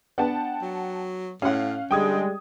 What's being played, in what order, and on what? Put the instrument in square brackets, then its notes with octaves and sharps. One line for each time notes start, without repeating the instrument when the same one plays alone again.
[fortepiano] B3 D4 [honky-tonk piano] F#5 G5 A5
[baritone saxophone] F#3
[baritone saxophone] A2 [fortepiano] C#4 F#5 [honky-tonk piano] F5
[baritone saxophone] D3 [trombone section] G3 G#3 [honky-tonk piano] G5 D#6 G#6